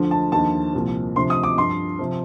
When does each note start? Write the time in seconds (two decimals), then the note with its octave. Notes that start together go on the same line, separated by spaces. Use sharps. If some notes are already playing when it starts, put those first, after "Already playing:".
Already playing: D2 D3 F3
0.11 A5
0.32 D#2 D3 F3 A5
0.73 C2 A#2 F3
1.16 D2 C3 F3 C6
1.30 D#6
1.43 D6
1.57 G2 F3 C6
1.99 C3 F3